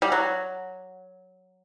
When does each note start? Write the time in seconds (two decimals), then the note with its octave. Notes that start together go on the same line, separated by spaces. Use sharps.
0.02 G3
0.12 F#3